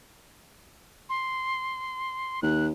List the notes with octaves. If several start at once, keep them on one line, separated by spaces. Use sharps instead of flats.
C6
D#2 F#6